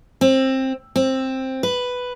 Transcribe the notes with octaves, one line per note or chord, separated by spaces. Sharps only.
C4
C4
B4